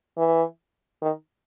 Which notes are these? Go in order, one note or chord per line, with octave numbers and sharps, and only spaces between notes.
E3
D#3